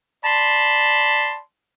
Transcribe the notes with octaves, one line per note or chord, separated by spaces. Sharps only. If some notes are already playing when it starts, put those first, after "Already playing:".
D5 A5 B5 C6